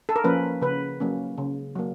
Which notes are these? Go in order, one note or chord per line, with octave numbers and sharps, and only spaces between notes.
A4
A#4
F3 A#3 C#4 B4
C#3 B4
F#3 A#3 C#4
C#3
F#3 A#3